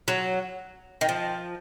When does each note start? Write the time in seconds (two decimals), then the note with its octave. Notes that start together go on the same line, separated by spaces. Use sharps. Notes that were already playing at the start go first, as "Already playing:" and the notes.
0.08 F#3
1.01 D#3
1.09 F3